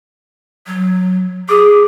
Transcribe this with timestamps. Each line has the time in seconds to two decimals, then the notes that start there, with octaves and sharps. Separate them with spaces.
0.67 F#3
1.49 G#4 D6 D#6